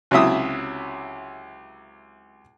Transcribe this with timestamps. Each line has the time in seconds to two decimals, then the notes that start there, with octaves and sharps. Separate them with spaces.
0.11 C#2 C3 F#3 E4 E5 D#6